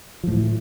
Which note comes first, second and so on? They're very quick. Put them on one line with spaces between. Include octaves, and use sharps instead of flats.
F3 A2 E3